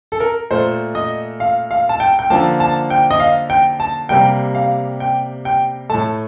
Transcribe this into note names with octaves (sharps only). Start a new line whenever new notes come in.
A4
A#4
A#2 A3 C5
D#5
F5
F5
A5
G5
G5
D3 F3 A#3 A5
A5
G5
D#5
F5
G5
A5
C3 G3 A#3 G5
F5
G5
G5
A2 A3 A5